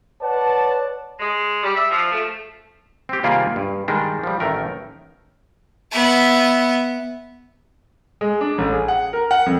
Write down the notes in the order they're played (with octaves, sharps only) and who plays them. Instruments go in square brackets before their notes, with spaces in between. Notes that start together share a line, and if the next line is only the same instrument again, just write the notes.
[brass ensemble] B4 C#5 D5 F#5 A5
[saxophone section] G#3
G3
E5
F3
A3
[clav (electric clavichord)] C4 G4
C3 D#3 G3 A#3 F4 G#4
G2
D#3 G3 G#3 D4
F3 G3
A1 D#3 A3 A#4
[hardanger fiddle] B3 E5
[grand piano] G#3
D4
A1
G#4
F#5
A#4
F#5
F2